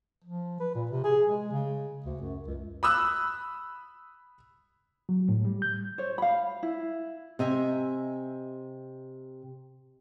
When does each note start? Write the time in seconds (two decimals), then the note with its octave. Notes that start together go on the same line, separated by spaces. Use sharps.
0.24 F3
0.60 B4
0.75 A#2
0.91 C3
1.04 G#4
1.27 G#3
1.51 C#3
2.06 D2
2.21 F#2
2.47 C#2
2.83 B5 D#6 E6 F#6
5.09 F#3
5.29 A2
5.45 G3
5.62 G6
5.98 C5 C#5
6.18 F5 B5
6.63 E4
7.39 C3 D#5 E5 G#5